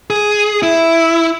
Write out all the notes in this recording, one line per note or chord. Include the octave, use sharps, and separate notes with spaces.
G#4
E4